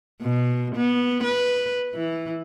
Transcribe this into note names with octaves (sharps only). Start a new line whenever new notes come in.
B2
B3
B4
E3